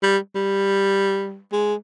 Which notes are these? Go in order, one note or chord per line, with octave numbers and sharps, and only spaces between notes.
G3
G3
G#3